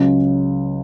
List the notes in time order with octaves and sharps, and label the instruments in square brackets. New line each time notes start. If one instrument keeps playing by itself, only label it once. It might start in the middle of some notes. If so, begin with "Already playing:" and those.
Already playing: [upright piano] C#2 C#3 F#3 C#4